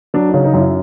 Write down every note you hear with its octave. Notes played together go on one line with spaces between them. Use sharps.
F#3 D4
C#3 D#4
D#4
F#2 E4